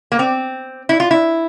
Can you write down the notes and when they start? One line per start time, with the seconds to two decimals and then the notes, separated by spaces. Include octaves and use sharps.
0.12 A#3
0.19 C4
0.89 E4
1.00 F4
1.11 E4